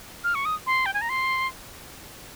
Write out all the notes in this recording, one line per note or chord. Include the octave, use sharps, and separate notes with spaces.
F6
C#6
D#6
C6
G5
G#5
A#5
C6